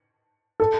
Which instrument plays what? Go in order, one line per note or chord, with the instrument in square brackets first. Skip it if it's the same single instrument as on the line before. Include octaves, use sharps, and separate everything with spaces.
[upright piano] A4